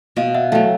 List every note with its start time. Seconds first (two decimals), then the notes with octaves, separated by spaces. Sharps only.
0.17 B2 D#5 F5
0.34 E5 F#5
0.52 F#3 A3 F5 G5